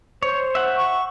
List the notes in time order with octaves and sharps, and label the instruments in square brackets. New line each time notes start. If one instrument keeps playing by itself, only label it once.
[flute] C5 [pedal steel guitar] C#5
[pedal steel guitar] E5 F#5
[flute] C#6